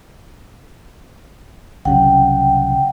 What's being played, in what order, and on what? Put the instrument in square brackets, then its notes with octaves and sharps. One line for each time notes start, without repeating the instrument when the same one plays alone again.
[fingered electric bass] C2 C#3 F#3 [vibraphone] F#5 G5